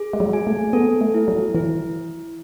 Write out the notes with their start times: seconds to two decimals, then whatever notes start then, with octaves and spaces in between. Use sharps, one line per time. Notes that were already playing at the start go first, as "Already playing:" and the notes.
Already playing: G#4
0.13 G#3
0.20 F#3
0.33 G#5
0.47 A3
0.73 B3 A4
1.01 A3
1.14 E4
1.28 F#3
1.55 E3 E4